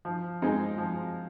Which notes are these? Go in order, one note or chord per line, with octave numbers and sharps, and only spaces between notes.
F3
G#3 C4 D#4
F3